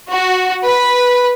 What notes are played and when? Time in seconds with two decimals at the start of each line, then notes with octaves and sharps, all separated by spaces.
0.12 F#4
0.64 B4